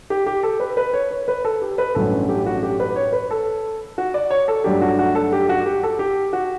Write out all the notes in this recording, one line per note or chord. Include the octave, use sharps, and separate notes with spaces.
G4
G4
A4
B4
B4
C#5
C#5
B4
A4
G4
B4
A1 G2 F#3 A3 C#4 A4
G4
F#4
G4
B4
C#5
B4
A4
F#4
D5
C#5
A4
G2 F#3 A3 D4 G4
F#4
F#4
A4
G4
F#4
G4
A4
G4
F#4